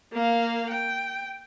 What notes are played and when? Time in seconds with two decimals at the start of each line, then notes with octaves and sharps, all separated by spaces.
0.13 A#3 F5
0.70 G5